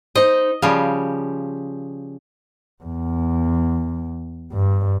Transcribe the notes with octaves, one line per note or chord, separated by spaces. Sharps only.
D#4 C5 D#5
C#3 F3 G3 F5
E2
G2